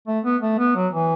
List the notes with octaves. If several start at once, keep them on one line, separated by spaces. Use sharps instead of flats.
A3
B3
A3
B3
F#3
E3